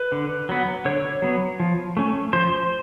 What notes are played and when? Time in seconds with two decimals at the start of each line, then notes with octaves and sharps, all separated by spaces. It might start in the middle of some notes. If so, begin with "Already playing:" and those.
Already playing: B4
0.12 D3
0.49 F#3 B3
0.85 D3 C#5
1.22 F#3 B3
1.60 F3
1.97 A3 C#4
2.33 F3 C5